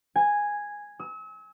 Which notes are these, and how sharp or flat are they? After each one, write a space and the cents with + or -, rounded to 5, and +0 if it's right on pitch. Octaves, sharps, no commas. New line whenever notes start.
G#5 -5
E6 -40